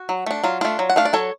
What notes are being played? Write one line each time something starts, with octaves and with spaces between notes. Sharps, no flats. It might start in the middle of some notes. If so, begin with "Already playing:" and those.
Already playing: F#4
F#3
A3 D4
F#3 F4
A3 D4 F4
F#3
F#5
A3 D4 F5
D5
F#3 A4 C#5